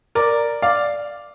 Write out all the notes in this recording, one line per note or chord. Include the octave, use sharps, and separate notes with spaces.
A#4 D5
D5 F5